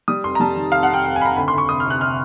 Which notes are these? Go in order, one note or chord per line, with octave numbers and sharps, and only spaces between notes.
G3 D#6
F1 C6
A#5
G3 A5
D#3
F1 F5
F#5
F1 G5
F1 G5
G#5
F1 A#5 B5
D2 B5
C6
D2 C#6
C3 D#6
F6
C3 F#6
C3 F6